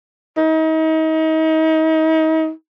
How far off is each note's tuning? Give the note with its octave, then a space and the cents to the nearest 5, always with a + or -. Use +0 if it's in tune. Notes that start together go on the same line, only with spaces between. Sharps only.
D#4 +35